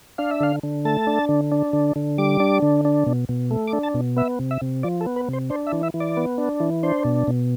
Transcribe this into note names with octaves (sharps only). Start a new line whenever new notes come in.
D4 F5
E5
D3 F5
D3
A3 A5
D4
D3
D4
D3
D3
G3 D6
D4
D3
D4
B2
B2
A3
D6
D4
A5
B2
B3 E5
C3
E5
C3
F3 D5
A4
B3
B4
C3 C5
D4 C5
E5
E3
E5
E3
D5
B3
D4
E3
D4 C5
B2
B2